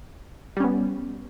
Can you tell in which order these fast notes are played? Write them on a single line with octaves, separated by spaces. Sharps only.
G3 C#4 B3